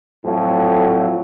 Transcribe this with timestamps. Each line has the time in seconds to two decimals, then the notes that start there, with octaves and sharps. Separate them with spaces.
0.24 F2 A2 F3 F#3 A3